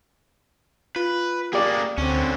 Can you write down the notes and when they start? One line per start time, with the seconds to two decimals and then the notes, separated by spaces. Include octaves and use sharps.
0.96 F4 B4
1.53 A#3 G4 G#4 D5
1.98 D2 D3 C4 C#4